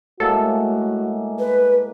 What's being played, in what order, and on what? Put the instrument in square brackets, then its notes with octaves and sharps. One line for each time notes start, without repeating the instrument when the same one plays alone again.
[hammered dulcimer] A2 G#3 A#3 [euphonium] F#4 [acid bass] A4
[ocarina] B4